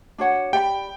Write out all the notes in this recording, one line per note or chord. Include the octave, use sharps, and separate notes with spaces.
D4 F#4 C#5 F#5
G4 D5 F#5 G5 B5